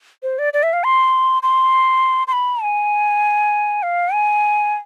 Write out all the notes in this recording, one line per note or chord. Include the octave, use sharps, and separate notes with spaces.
C5
D5
D5
E5
F5
C6
C6
C6
B5
G#5
F5
G#5